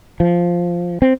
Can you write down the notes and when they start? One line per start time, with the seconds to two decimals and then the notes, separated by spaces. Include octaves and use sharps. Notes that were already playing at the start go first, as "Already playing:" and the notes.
0.20 F3
1.02 C4